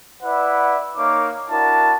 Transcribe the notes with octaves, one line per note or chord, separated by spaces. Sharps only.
E4 B4 D5 E5 F#5
A#3 D#4 C#5 D6
D4 E4 F#4 A#4 A5